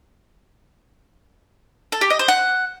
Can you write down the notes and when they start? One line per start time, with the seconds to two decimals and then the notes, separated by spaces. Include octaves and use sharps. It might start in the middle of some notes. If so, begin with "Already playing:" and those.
1.92 A4
2.01 G4
2.10 D#5
2.19 C5
2.28 F#5